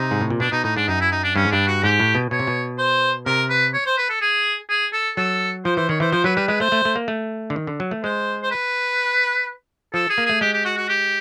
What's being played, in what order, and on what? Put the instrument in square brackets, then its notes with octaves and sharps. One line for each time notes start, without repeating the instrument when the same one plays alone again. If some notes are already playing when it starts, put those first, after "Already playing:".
Already playing: [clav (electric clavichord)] C3 [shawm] D#4
[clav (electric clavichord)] G#2
A2
A#2
[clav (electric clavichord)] B2 [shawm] D4
[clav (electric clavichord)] B2 [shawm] D#4
[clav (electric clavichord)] A2 [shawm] D#4
[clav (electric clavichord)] G#2 [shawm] D4
[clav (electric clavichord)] F#2 [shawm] D#4
[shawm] E4
D#4
D4
[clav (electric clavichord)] G2 [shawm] C#4
[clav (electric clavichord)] G#2
[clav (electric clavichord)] G2 [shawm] D4
[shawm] F#4
[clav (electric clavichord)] G#2 [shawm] G4
[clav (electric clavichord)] A2
B2
[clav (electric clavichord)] B2 [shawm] C#5
[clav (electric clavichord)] C3
B2
[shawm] C5
[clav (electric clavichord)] C3 [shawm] A#4
[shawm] B4
C#5
C5
B4
A4
G#4
G#4
A4
[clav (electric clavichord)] F#3 [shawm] A4
[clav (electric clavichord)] F3 [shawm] C5
[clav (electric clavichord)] E3 [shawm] C5
[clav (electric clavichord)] D#3 [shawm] C#5
[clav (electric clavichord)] E3 [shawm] C5
[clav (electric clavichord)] F3 [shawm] C5
[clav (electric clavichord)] F#3 [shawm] B4
[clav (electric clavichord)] G3 [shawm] B4
[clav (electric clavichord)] G#3 [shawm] B4
[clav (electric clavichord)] A3 [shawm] C5
[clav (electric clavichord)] A3
A3
A#3
A3
D3
D#3
D3
F#3
A3
[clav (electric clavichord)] G#3 [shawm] C5
[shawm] C5
B4
[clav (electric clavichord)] F3 [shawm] A4
[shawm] G#4
[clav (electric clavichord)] A#3
[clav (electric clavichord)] A3 [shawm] G#4
[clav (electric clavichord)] G#3 [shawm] G4
[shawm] G4
F#4
F#4
G4